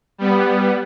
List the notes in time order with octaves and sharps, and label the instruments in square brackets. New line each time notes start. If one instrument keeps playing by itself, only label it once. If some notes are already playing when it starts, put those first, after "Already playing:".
[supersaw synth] G3 B3